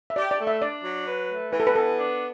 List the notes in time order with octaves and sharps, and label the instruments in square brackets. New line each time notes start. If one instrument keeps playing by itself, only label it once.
[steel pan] E5
[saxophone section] G4 [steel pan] D5
[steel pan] D5
[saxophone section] A3
[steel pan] E5
[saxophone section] D4 [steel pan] D5
[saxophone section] F#3
B4
A3
[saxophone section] E3 [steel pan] B4
[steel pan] A4
B4
[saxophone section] B3 [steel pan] A4
[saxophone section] D4